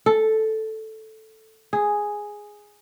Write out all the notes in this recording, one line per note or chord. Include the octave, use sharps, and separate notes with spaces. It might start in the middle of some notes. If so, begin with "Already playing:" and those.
A4
G#4